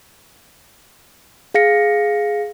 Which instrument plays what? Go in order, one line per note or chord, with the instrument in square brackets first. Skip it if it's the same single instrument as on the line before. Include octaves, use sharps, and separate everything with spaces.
[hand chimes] G#4 F5 A#6 C#7